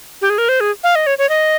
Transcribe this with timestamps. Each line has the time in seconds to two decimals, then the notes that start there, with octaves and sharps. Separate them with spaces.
0.22 G4
0.30 G#4
0.38 A#4
0.49 C5
0.60 G#4
0.84 F5
0.95 D#5
1.07 C#5
1.18 C#5
1.29 D#5